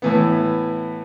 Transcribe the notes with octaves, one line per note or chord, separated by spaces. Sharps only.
A2 E3 B3